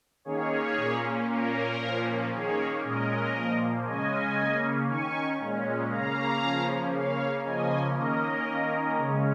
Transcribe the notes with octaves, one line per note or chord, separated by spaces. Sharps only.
D#3 A#3 C#4 G#4 C#5
A#2 A#3 C#4
A#2 A#3 C#4 A#4
A#2 F3 A#3 C#4
D#3 A#3 C#4 G#4 C#5
A#2 G#3 C#4 A#4 D#5
A#2 F3 A#3
C#3 G#3 C#4 D#5 G#5
C#3 A#3 C#4
D#3 C#4 G#5 C#6
A#2 G#3 C#4
C#3 A#3 C#4 F5 A#5
C#3 F3 A#3 C#4
C#3 A#3 C#4 C#5 F5
C#3 F3 A#3 C#4 D#5 G#5
D#3 A#3 C#4 A#4 D#5
D#3 A#3 C#4
C#3 G#3 C#4